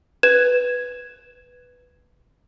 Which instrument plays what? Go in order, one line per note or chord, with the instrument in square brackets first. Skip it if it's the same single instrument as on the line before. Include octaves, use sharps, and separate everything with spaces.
[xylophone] B4 G#6 E7